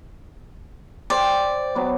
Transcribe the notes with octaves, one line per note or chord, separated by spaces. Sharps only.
C5 D5 G5
F#3 B3 D6